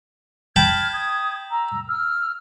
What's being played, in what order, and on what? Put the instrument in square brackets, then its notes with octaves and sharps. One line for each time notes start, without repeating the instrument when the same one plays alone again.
[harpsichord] G5 A5 B5 [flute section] F6 G#6
[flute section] D#6 G#6
A#5 E6
E6 F6